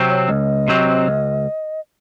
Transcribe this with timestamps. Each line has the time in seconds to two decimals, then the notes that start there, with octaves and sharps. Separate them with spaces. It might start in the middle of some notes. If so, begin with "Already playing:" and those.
Already playing: C3 F#3 C4
0.09 C#5
0.29 C#2 D#5
0.68 C3 F#3 C4
1.07 C#2